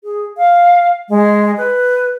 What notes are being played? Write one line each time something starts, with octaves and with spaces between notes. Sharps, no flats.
G#4
F5
G#3
B4